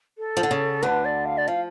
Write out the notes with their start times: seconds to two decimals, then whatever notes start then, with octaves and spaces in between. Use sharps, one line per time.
0.18 A4
0.37 F3
0.43 D3
0.51 C#3
0.82 D2 D3 B4
1.05 D5
1.25 F5
1.37 D5
1.47 F3 F5